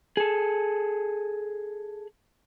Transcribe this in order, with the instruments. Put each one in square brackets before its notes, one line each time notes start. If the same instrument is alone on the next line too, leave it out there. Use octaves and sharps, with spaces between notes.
[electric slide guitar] G#4 A4